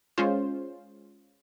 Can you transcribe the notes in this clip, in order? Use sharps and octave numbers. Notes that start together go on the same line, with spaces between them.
G#3 C#4 F4 C5